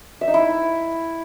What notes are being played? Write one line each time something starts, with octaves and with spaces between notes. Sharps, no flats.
E5
D#4
E4